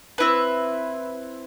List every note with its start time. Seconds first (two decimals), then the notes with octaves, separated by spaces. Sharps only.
0.18 C4 E4 B4